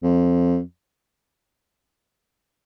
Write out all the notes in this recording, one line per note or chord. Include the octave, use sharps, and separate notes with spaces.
F2